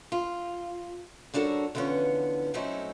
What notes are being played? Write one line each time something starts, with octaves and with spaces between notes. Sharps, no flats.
F4
G3 D4 F#4 A4 A#4 C#5
D3 E3 F3 B3 C#4
F#3 A3 C4 C#4 D#4 E4